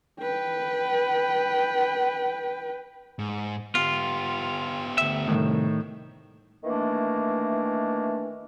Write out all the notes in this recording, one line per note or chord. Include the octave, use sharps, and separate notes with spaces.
B4 G5
G#2
B3 F4 G4
D2 E5
C2 A2 D#3
D#3 E3 A3 A#3 D4